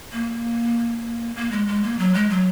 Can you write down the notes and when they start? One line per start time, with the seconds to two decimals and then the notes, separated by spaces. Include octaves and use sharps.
0.12 A#3
1.36 A#3
1.51 G#3
1.67 G#3
1.83 A#3
1.99 F#3
2.14 G#3
2.30 F#3